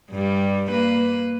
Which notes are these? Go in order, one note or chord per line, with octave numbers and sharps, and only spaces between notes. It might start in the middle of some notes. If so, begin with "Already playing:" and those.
G2 G3
A#3 B4